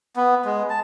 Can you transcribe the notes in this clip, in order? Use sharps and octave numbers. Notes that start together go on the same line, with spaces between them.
B3
G#3
A5